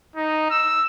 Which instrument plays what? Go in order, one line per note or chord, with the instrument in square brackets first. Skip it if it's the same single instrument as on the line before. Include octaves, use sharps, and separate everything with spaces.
[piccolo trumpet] D#4
E6